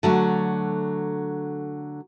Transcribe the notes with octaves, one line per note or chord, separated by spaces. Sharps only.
D3 F#3 A3